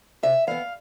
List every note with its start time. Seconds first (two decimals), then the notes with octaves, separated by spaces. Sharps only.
0.23 C3 E5
0.47 E3 B3 F5